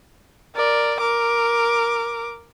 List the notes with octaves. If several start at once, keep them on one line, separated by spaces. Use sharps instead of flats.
A#4 D5
A#4 D6